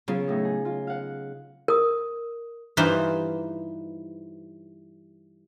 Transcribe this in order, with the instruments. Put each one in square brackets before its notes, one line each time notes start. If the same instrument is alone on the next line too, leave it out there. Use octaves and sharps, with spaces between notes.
[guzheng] C#3 [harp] F#3 B3 F4
[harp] A2 D#4
G#4
F4
F5 F#5
[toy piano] A#4 D#6
[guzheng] G2 E3 D#4 F4 B4 C5